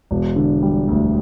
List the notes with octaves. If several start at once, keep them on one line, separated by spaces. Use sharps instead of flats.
E1
D3
G3
D2